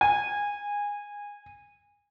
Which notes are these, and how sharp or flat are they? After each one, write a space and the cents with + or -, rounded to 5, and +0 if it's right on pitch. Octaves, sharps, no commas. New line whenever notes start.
G#5 -20